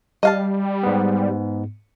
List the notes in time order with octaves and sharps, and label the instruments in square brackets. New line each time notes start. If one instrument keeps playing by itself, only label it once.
[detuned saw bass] G3 [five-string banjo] D#5 F5 A5
[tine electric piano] G#2 B3